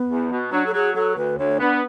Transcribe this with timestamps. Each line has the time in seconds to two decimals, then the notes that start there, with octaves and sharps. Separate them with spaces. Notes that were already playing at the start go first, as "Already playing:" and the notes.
Already playing: B3
0.08 E2
0.30 B2
0.52 F#3 D4
0.66 A4
0.73 F#3 G#4
0.95 F#3 A4
1.16 D2 B4
1.38 D2 C#5
1.60 B3 D4